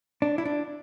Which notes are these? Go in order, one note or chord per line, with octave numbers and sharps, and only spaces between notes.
D4
E4
D4